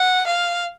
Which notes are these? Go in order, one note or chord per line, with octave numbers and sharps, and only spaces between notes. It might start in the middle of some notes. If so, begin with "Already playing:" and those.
Already playing: F#5
F5